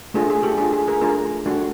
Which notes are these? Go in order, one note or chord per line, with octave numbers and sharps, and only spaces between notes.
A3 D4 F4 G#4
G#4
G4 A4
A3 D4 F4 G#4
G#4
G#4 A#4
A3 D4 F4 G#4 A#4
A3 D4 F#4